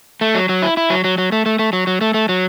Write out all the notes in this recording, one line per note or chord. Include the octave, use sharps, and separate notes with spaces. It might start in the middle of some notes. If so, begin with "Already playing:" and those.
A3
F#3
F#3
E4
E4
F#3
F#3
F#3
A3
A3
A3
F#3
F#3
A3
A3
F#3